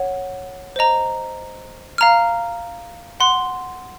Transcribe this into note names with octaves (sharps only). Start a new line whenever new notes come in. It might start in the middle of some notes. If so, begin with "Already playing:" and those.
Already playing: C#5 F#5
C5 D#5 A#5
F5 A#5 F6
F#5 C6 F#6